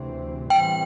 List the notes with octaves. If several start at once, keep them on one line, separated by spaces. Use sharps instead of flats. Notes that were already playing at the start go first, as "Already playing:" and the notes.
Already playing: D2 C3 E3 C4
A2 E3 G3 C4 G5